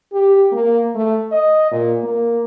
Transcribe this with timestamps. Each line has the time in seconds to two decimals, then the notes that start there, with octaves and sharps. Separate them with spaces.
0.13 G4
0.53 A#3
0.95 A3
1.32 D#5
1.72 A#2
2.03 A#3